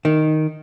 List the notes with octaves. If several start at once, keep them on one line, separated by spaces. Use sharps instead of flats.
D#3